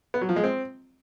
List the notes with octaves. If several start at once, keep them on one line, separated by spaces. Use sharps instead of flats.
B3
F#3
F3
G#3
C4